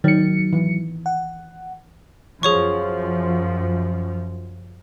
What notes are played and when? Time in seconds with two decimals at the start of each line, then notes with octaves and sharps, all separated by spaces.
0.04 D#3 F#3 C#7
0.53 E3
1.06 F#5
2.43 F#2 F3 G#4 C#5 C#6